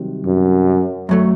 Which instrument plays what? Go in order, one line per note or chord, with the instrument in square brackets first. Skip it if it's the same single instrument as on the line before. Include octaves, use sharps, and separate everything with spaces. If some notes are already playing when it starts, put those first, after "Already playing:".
Already playing: [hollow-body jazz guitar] C2 C3 D#3 F#3
[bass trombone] F#2
[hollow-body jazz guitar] F#2 F#3 A3